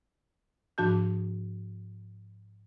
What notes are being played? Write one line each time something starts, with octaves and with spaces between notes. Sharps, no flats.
G#2 F3 D4 F#4 A5 G6